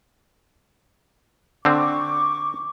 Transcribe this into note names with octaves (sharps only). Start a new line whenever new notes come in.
D3 C4 C#6 D6